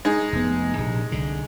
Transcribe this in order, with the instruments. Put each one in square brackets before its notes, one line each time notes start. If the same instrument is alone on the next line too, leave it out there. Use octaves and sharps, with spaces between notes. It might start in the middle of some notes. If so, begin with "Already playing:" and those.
[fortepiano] G#3 D#4
[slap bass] F1 B3
A#1 C3
C2 D3